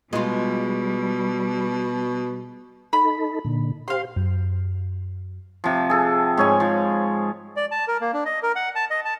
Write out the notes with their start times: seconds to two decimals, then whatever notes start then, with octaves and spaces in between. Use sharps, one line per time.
0.13 B2 G3 G#3 F4
2.93 D#4 A4 B5
3.45 A#2 D3
3.88 G4 C5 F5 C6
4.16 F#2
5.64 C3 F3
5.90 G#4 A4
6.37 G#2 C#5 G#5
6.60 F3
7.56 D5
7.71 A5
7.88 A#4
8.01 A#3
8.14 D4
8.25 D#5
8.43 A#4
8.56 F#5
8.75 A5
8.90 D#5
9.05 A5